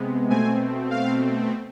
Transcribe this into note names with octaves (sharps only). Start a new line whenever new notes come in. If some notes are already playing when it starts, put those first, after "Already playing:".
Already playing: C3 G#3 B3
B2 A3 C4 G#5
F5